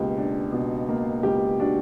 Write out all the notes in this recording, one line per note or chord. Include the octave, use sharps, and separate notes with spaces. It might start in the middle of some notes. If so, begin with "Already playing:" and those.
Already playing: C#2 B2 A#3 G4
D4
B2
A#3
C#2 G4
D4 F#4